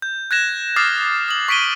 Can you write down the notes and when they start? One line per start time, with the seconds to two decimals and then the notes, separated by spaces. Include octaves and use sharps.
0.02 G6
0.31 F#6 G#6 A#6 E7
0.76 D6 D#6 F6 A6 C7
1.28 D#6 F#7
1.48 C#6 B6 D7 D#7 G7